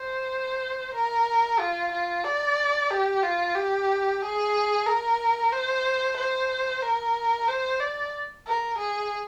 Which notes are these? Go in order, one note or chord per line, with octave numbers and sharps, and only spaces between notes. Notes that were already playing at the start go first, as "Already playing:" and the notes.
Already playing: C5
A#4
F4
F4
D5
G4
F4
G4
G#4
A#4
C5
C5
A#4
C5
D5
A#4
G#4